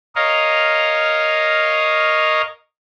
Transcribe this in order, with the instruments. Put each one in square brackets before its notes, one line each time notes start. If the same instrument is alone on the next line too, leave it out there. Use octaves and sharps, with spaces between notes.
[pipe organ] A#4 C#5 D#5 F5